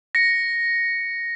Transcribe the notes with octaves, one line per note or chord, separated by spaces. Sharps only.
A#6 C#7